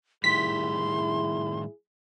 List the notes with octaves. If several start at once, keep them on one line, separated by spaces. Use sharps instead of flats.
A2 D#3 G3 E4 G#4 C6 B6